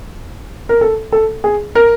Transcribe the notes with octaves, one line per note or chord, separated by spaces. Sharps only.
A#4
A4
A4
G#4
A#4